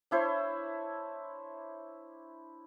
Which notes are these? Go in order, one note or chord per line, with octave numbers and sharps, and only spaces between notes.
D4 E4 C5 C#5